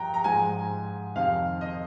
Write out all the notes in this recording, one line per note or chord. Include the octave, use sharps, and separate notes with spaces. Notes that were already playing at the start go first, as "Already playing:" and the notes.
Already playing: G2 F3 G5 A#5
A#5
G#2 F3 G#3 G#5
F2 C3 D#3 F5
D#5